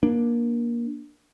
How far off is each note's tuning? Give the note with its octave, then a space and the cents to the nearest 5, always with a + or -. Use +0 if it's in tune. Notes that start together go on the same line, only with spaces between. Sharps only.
A#3 +20 D4 +0